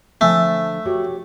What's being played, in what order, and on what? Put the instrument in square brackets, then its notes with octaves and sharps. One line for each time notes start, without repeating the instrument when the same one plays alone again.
[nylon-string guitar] D3 F3 G#5 [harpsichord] A3
[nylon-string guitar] F#4 G4 C#5